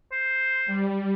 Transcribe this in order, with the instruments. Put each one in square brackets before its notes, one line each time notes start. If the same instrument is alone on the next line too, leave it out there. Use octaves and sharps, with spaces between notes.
[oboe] C5
[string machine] G3